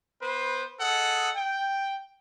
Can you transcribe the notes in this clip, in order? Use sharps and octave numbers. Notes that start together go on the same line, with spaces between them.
B3 B4 C5
G#4 A4 D#5 F#5
G5